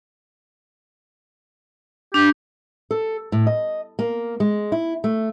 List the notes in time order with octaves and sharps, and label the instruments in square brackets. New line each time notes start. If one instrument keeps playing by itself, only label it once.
[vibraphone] D4 [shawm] G4
[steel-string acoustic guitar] A4
A2
D#5
A#3
G#3
E4
A3